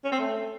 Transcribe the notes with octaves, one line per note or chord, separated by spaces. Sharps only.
C#4
C4
A3